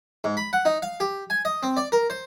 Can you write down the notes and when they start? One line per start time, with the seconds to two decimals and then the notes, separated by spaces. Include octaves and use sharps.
0.24 G#2
0.37 B5
0.53 F#5
0.65 D#4
0.82 F5
1.00 G4
1.30 G#5
1.45 D#5
1.63 C4
1.77 D5
1.92 A#4
2.10 C5